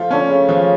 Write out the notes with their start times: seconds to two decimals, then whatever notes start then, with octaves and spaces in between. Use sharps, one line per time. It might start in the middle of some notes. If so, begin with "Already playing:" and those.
Already playing: F3 A3 F4
0.11 D3 C#4
0.30 C#3 A3
0.49 F3